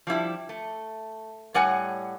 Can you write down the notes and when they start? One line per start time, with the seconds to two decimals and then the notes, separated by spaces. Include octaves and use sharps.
0.07 F3 G3 E4 G4
0.49 A3
1.54 A2 G3 C#5 F#5 G#5